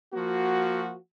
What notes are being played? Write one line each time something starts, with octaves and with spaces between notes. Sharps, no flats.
F3 A#3 F#4